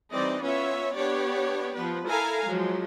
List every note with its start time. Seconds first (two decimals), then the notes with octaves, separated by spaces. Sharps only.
0.11 E3 G3 C4 D#4 D5 D#5
0.41 B3 C#4 F4 C#5 E5
0.94 B3 D4 G4 C#5 D5
1.74 F3 B3 B4
2.07 E4 A4 A#4 F5 G#5 A#5
2.47 F3 F#3 G#3